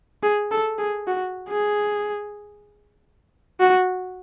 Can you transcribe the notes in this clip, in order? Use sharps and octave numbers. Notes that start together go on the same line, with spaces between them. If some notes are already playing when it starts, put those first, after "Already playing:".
G#4
A4
G#4
F#4
G#4
F#4